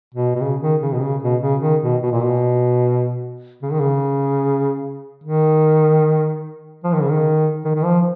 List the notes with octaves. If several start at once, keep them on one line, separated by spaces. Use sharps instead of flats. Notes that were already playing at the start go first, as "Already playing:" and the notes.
B2
B2
C#3
D#3
C#3
B2
C#3
B2
C#3
D#3
B2
B2
A#2
B2
C#3
D#3
C#3
D#3
F3
D#3
C#3
D#3
D#3
D#3
F3